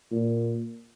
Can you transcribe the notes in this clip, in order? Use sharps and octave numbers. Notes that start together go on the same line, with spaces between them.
A#2